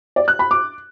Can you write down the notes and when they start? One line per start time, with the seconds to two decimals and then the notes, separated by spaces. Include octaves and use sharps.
0.16 D5
0.28 F#6
0.39 B5
0.51 D6